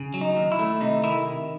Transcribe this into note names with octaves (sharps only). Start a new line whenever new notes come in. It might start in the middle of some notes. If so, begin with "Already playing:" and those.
Already playing: C#3
F#3
D#4
D#2
E4
A3
C3 D#4
D#3 E4